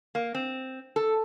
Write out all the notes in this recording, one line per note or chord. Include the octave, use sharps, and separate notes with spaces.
A#3
C4
A4